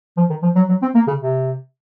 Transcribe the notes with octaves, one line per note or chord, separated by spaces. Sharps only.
F3
D#3
F3
F#3
F#3
C4
A#3
C#3
C3